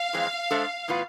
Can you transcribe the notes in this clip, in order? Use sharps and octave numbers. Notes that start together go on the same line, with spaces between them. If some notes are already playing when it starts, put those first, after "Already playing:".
Already playing: F5
F2 E3 G#3 C4
G#3 D4 A4 C5 E5
A2 E3 B3 F4 B4